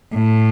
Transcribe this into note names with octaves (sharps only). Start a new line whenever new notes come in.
A2